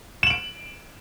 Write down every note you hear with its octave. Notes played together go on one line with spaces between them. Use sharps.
D7 E7 F#7